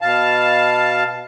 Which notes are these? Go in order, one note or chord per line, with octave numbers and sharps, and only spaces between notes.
B2 F5 A5